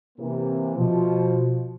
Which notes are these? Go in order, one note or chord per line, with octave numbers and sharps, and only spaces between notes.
C3 E3 A#3
B2 F3